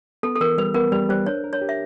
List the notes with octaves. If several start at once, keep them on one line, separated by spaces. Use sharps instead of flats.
B3 A4
A4
E3 A#4
G3 B4
B3 A#4
G3 B4
G3 C5
D4 C#5
A#4
C#5
G4
E5